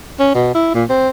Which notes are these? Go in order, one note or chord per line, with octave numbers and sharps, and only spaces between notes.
C#4
B2
E4
A#2
C4